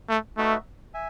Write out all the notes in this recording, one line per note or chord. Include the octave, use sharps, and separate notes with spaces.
A3
A3 D#4 F#4 B4 E5
E5 G#5